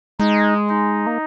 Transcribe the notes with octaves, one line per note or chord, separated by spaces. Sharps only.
G#3 D#4
D#4
A#3